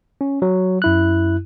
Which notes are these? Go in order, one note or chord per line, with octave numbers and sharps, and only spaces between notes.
C#4
F#3
F#2 E4 F#6